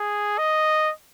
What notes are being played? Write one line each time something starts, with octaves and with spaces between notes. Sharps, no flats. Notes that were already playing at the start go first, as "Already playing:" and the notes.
Already playing: G#4
D#5